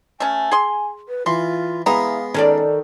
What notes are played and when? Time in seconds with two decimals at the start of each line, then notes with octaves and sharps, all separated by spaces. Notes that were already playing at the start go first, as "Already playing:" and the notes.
0.20 A3 C#4 G#5
0.52 G#4 C6
1.08 B4
1.26 E3 F4 C6
1.86 E3 G#3 B3 F5 A#5
2.34 D#3 C#4 D#4 A4 D5